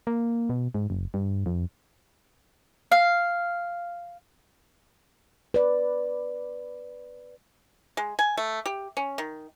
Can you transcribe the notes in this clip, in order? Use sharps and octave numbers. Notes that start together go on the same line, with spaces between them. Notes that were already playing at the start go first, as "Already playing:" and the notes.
A#3
B2
G#2
F#1
G2
F2
F5
B4 D5
G#3
G#5
A3
G4
C#4
D#3